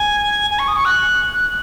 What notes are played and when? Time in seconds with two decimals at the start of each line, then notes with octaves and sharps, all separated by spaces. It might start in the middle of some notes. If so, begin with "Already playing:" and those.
Already playing: G#5
0.50 G#5
0.59 C#6
0.67 D#6
0.76 C#6
0.85 F#6